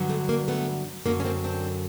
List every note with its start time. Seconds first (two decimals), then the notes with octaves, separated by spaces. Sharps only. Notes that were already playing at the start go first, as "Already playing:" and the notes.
Already playing: G2 D3 F#3
0.09 A3 B3
0.29 A#3
0.48 A3 B3
1.06 F#2 D3 F#3 A#3
1.20 C#4
1.24 A#3 C4
1.44 C4 D4